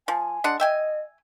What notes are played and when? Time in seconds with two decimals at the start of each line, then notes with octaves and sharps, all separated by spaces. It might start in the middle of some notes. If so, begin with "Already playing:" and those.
0.08 F3 G#5
0.44 G#3 D4 F#5
0.60 D#5 E5 G5 G#5